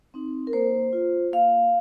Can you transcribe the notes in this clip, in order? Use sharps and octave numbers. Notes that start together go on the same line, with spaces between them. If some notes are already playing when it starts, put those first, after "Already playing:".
C4 D#4
A#4
A#3 C5
F4
A#3 F5